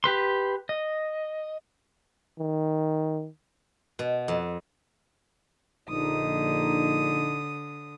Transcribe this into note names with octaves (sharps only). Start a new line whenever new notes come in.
G4 B4 C6
D#5
D#3
B2
F2
A#1 D3 D#4 D#6